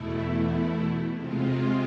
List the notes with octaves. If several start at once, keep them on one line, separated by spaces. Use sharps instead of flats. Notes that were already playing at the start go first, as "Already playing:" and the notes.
Already playing: E2 B2 A3 E4
C3 G#3 C4 F4